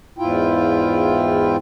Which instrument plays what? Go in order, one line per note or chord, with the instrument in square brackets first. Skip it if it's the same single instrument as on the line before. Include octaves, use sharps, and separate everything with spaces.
[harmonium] E2 G#2 E4 F4 G5